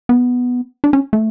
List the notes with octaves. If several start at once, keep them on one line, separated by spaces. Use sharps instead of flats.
B3
D4
C#4
A3